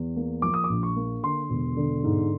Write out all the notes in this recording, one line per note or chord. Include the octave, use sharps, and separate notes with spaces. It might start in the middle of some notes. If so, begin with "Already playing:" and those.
Already playing: E2
A#3
F3 D6
D#6
D6
A#1
C#6
A#3
D3 C6
E1
D3
G#2